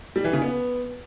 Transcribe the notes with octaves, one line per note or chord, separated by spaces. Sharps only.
G3
E3
C#3
B3